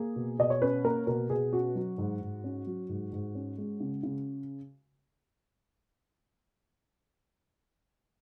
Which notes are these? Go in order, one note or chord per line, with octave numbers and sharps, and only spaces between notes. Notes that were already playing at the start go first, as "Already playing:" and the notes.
Already playing: A#3 G#4
B2
B2 D#5
C#5
C#4 B4
A#3 A#4
B2 A#4
B2 G#4
C#4 F#4
F#3
G#2
G#2
C#4
F#3
G#2
G#2
C#4
G#3
C#3
C#3